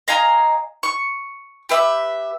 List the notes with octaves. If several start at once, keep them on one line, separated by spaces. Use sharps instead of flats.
D#5 F5 G#5 A#5
C#6
G4 B4 E5